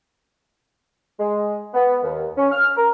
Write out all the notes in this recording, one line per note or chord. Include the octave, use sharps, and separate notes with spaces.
G#3
B3
D#2
C#4
F6
A#4